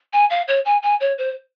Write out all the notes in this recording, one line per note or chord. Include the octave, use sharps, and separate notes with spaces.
G#5
F5
C#5
G#5
G#5
C#5
C5